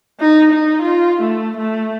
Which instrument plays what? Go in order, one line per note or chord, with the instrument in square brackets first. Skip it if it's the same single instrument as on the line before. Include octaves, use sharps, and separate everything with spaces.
[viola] D#4
D#4
F4
A3
A3